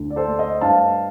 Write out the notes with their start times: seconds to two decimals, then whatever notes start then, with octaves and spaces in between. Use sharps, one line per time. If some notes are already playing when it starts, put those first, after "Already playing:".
Already playing: D2
0.10 D5
0.16 A4 C5
0.28 A3
0.39 C5 D#5
0.61 G2 F5 A5